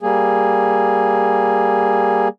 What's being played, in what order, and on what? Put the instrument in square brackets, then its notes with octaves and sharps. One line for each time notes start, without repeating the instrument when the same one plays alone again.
[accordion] G3 A#3 G#4